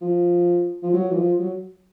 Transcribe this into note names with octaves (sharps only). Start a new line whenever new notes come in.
F3
F3
F#3
E3
F3
F#3